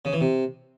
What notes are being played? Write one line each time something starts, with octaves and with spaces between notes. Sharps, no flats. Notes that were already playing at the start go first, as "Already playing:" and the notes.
C#3
E3
C3